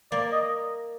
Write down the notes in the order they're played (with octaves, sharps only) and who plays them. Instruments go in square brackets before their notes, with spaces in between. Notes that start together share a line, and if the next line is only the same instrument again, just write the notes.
[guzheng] A#3 [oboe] D5
[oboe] D#5